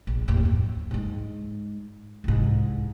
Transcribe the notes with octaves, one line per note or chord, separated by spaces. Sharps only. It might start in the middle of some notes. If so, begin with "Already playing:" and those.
A#1
D#2 A2
F#2
G#2 G#3
C2 G#2